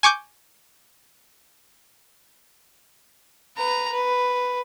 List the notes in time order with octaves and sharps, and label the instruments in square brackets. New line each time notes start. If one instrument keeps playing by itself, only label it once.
[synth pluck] G#5 C#6 D6 G6
[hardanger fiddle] B4 A#5
B4